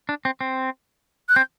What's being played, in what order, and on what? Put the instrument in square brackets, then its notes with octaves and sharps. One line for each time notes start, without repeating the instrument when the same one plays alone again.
[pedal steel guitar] D4
C4
C4
[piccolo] F#6
[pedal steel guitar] C4 [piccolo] G6